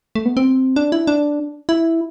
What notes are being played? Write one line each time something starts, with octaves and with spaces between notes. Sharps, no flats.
A3
B3
C4
D4
E4
D4
E4